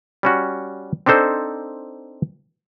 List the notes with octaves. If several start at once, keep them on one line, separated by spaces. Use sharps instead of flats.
G3 C#4 F#4
C4 D4 D#4 A4 C5